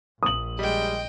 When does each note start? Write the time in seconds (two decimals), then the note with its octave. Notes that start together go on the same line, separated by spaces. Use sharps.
0.23 A#1 D#6 F#7
0.59 G3 G#3 D#5 G5